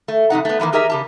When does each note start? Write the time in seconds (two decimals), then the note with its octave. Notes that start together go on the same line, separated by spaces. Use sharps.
0.08 A3
0.30 F2 C3 D#4 F#5
0.45 A3 B3
0.60 D#3 E3 G3 A#3
0.73 D#4 G4 G#4 A#4 D#5 E5
0.90 C#3 G4 A5